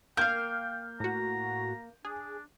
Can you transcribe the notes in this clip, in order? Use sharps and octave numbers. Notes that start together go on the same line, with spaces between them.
A#3 F5 G5 G6
A2 F#4 A#5
D4 G#4